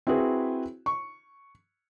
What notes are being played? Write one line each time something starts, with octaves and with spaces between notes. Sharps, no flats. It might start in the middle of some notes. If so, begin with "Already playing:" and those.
C4 E4 F#4 G#4 B4
C#6